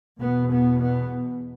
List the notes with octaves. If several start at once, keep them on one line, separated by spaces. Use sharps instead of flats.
E2 B2 B3
B3
B3